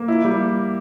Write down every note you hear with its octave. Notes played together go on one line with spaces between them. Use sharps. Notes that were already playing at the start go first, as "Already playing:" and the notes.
Already playing: A#3
E4
G3